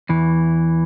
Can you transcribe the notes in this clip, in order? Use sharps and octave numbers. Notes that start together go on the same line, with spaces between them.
E2 E3